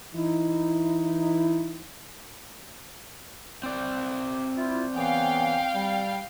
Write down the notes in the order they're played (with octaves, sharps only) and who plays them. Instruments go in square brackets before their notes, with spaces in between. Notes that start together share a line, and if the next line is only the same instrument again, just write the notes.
[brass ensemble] E3 D#4 E4
[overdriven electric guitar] C4 D5
[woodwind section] E4 F4
[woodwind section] C#3 E3 B3 [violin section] F5 G5
[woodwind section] G3